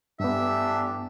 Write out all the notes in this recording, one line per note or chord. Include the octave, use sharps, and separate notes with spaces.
A1 G2 B3 D4 G4 E5